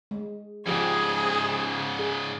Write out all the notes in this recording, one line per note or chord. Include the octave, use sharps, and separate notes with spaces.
G#3
G#2 C#3 F3 G4 G#4
G#4